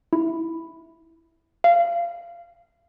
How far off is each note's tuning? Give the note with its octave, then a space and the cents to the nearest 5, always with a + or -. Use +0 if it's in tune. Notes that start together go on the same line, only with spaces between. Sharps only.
E4 -5
F5 -25